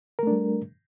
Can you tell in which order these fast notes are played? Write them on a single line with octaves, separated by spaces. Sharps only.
A#4 A3 D4 G3